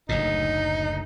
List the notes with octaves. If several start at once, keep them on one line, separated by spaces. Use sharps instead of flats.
F#1 D2 A2 D#4